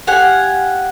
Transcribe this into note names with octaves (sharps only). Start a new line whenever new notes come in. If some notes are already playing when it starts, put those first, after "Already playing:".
G4 F5 F#5 G#5